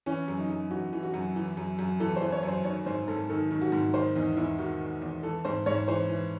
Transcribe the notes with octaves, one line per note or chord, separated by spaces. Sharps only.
E3 C#4
F#2
D#4
F#2
E3 F#4
E3
F#4
F#2
E3
F#2
F#2
E3 A4
C5
E3
C#5
F#2
C5
D#3 C#5
G#2 C5
G#2 A4
D#3 A4
D#3
F#4
G#2
D#3 C5
E2 D#4
E2 E4
D#3 F#4
D#3
E2
E3 A4
G#2 C5
G#2 C#5
E3 C5
E3